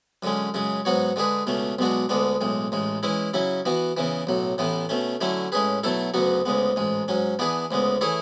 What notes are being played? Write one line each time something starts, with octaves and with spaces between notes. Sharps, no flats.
F#2 D3 G#3 C#4
F#2 C#3 G#3
G#2 F#3 B3 F#4 C#5
D3 G#3 D4 G#4 B4
C#2 B2 A3 C#4
B1 B2 G#3 D4 F#4
D2 D3 G#3 B3 D4
B1 A2 G#3
A1 A2 G#3
E3 G#3 C#4 E4
C#3 F#3 C#4 E4
E3 B3 F#4
E2 C#3 E3
B1 A2 F#3
A1 A2 E3 B3
B2 A3 C#4
D3 F#3 A3 C#4 E4
A2 G#3 C#4 G#4 B4
B2 F#3 A3 E4 A4
D2 C#3 F#3 B3 F#4
D2 C#3 G#3 B3
A1 G#2 G#3
G#2 F#3 C#4
E3 B3 D4 G#4 B4
D2 C#3 G#3 B3
E3 A3 E4 G#4 C#5